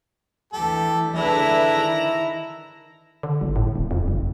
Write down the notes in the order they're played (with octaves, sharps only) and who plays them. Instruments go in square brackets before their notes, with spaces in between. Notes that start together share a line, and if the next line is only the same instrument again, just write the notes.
[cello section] D2 E3 [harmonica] G4 A4
[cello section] D3 G#4 B4 [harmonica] D4 A4 E5 [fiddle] E4 A#5
[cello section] D#3
[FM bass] D3
G1
A2
D1
F2
F#1